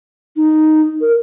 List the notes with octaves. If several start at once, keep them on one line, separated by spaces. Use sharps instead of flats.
D#4
A#4